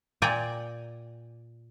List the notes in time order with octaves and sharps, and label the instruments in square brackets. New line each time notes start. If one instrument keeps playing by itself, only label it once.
[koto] A#2 D5 G5 G#5 A#5